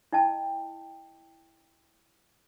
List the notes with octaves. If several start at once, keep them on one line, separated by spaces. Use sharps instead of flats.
E4 D#5 G5 A5